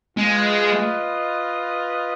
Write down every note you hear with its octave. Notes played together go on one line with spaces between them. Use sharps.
G#3 F4 B4 D#5